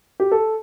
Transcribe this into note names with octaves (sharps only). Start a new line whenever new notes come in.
G4
A4